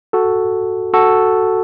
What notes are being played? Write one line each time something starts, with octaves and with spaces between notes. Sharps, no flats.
F#4 A4
F#4 A4